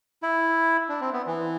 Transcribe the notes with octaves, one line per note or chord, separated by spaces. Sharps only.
E4
D4
C4
B3
E3